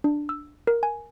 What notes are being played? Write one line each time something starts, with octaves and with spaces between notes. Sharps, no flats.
D4
E6
A#4
G#5